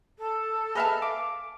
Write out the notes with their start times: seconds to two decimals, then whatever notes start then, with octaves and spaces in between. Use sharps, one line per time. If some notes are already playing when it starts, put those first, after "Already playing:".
0.18 A4
0.75 G#4 B4 D#5 E5 A5 F6
1.02 F5 D6